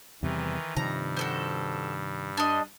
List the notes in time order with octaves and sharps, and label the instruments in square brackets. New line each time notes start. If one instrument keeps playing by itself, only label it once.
[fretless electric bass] E2 C3 G3 [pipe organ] D#3 E3
[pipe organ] G2 [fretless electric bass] C3 D#3 F3 [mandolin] A#5
[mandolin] F#4 A4 C5
D4 D#5